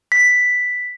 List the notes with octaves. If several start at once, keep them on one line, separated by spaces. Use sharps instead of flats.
B6